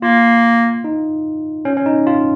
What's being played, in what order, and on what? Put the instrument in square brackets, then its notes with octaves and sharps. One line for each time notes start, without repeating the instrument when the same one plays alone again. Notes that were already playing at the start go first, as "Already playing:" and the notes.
[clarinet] A#3 [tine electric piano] F4
[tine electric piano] D#4
C#4
C#4
D#4
F4